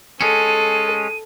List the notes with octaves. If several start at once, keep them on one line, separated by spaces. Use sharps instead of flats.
G#3 C#4 A4 D#7